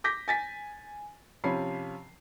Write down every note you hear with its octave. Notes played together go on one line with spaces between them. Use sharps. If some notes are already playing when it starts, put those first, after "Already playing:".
D6 G6 A#6 B6
G#5 A6 B6
C3 F3 C#4 B5 C7